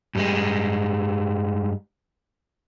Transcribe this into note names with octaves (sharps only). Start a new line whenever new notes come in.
G2 G3 G#3